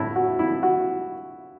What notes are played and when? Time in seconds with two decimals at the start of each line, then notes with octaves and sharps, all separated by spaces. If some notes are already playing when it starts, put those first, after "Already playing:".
Already playing: A2 E4
0.16 F#4
0.39 E4
0.63 F#4